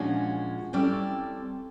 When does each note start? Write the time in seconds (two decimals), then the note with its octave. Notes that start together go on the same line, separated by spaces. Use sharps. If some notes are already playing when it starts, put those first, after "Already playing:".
Already playing: A#2 F3 G#3 C#4 D4 F#4
0.73 G3 C4 C#4 E4 A4 D5